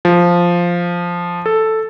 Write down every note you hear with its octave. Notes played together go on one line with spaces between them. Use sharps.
F3
A4